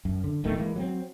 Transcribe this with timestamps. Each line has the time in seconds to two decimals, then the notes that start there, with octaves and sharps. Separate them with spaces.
0.05 F#2
0.24 D3
0.44 D1 G1 D#3 A3
0.56 E3 G#3 A#3
0.76 F#3 A#3 C4